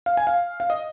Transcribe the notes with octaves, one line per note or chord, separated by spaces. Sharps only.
F5
G#5
F5
F5
D#5